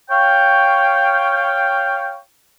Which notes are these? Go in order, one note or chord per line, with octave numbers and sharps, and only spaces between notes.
C#5 F5 G5